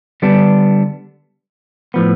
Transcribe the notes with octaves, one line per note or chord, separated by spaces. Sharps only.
D3 G3 B3 D4
A2 F3 B3